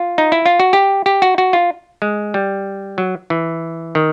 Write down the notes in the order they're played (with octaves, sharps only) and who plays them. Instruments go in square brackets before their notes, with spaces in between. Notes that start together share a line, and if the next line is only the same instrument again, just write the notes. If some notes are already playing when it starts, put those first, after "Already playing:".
Already playing: [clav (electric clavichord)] F4
D#4
E4
F4
F#4
G4
G4
F#4
F#4
F4
G#3
G3
F#3
E3
D#3